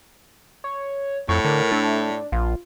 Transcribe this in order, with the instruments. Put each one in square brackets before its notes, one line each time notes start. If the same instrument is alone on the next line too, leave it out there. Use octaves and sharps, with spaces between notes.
[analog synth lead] C#5
[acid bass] F2 [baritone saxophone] A2 [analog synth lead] C#6
[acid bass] D3 [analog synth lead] A#4
[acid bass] A3 [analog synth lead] D4
[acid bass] A#1 [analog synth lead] F4